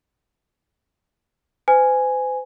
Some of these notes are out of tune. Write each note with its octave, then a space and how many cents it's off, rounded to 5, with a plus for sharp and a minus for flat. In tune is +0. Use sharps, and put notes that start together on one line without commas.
C5 -45 G#5 +0